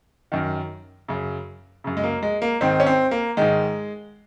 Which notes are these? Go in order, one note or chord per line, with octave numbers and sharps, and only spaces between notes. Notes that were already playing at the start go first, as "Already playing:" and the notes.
F#2 D#3
F#2 C#3
F#2 C#3
G#3
A#3
G#3
A#3
G#2 D#3 C4
C#4
C4
A#3
G#2 D#3 G#3